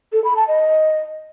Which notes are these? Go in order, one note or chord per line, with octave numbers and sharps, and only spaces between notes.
A4
B5
A5
D#5